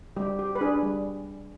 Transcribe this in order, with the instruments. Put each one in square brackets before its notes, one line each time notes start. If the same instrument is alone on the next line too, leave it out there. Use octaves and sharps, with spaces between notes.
[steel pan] G3 G4
G4
B4
D4 G#4
G3